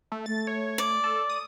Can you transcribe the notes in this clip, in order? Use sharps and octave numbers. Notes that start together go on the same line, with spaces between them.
A3
A3 A6
C#5
D5
A4
D#6